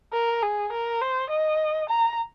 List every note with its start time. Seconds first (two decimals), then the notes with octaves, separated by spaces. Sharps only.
0.13 A#4
0.43 G#4
0.73 A#4
1.02 C5
1.30 D#5
1.90 A#5